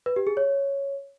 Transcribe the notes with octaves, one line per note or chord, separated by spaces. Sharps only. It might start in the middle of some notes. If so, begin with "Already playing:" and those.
B4
G4
G#4
C#5